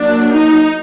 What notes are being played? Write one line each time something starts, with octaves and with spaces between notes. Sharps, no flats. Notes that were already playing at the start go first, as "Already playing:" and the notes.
Already playing: F#3 A#3 D4
D#4